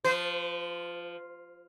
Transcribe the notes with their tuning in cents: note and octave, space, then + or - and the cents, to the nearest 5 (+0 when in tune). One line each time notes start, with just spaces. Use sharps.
F3 +0 C5 -35